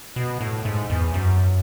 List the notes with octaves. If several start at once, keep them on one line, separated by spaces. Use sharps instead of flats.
B2
A2
G#2
E2
F#2